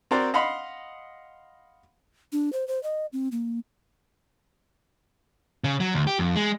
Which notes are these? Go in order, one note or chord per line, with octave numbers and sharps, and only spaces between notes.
C4 F#4 A#4 C5 D5 A#5
D#5 F5 F#5 B5 C6
D4
C5
C5
D#5
C4
A#3
C#3
F#3
D2
G4
F2
G#3